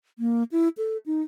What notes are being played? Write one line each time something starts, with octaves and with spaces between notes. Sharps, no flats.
A#3
E4
A4
D#4